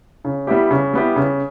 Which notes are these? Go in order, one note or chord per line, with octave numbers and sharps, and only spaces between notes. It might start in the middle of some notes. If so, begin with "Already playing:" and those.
C#3
G3 B3 E4 G4
C#3
G3 B3 E4 G4
C#3